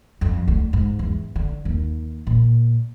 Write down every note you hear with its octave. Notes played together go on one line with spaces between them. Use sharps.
F2
D2
G#2
E2
D3
D#2
A#2